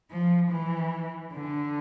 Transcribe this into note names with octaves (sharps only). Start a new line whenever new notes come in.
F3
E3
D3